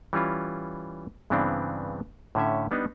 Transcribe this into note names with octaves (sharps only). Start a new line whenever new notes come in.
E3 G3 C#4 F4
G2 C#3 E3 B3 C4 D4
A2 D3 C#4 E5
G3 B3 D4 D#4